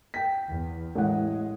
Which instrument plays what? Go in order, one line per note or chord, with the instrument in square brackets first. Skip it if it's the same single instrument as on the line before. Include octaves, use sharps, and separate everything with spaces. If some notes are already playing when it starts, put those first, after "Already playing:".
[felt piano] G5 B6
[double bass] E2
[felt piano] A1 F#5 [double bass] G#3